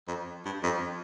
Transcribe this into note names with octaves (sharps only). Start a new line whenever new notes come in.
F2
G2
F2